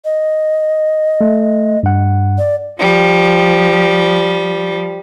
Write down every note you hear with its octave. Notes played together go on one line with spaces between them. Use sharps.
D#5
A3
G2 F#5
D5
F3 G3